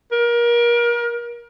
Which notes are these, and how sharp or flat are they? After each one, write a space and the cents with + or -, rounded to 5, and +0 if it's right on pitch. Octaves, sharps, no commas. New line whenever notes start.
A#4 +30